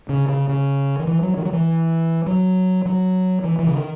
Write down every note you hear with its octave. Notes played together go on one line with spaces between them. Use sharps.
C#3
C#3
C#3
D#3
E3
F#3
D#3
F#3
E3
F#3
F#3
E3
E3
C#3
D#3